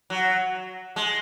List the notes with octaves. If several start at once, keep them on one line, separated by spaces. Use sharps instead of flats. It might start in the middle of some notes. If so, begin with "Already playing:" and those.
F#3
G#3